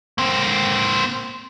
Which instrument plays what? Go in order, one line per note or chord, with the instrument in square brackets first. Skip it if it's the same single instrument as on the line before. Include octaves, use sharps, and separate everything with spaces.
[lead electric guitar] A#3 C4